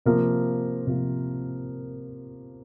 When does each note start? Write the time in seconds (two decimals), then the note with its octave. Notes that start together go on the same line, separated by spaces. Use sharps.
0.06 C3 F3 A#3 A#4
0.87 C3 F3 A#3